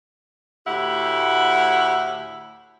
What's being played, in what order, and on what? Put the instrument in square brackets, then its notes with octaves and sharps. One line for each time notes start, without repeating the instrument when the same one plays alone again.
[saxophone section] D2 A2 E4 G4 F#5